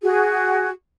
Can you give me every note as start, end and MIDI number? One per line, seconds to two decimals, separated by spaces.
0.03 0.69 66
0.03 0.69 68